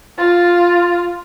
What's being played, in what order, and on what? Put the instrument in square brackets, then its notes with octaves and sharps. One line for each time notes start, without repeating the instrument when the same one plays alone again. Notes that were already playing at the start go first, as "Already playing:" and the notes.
[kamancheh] F4 [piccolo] A6